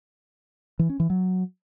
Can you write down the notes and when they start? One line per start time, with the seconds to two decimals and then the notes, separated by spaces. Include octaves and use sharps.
0.79 E3
0.89 C#4
1.00 E3
1.10 F#3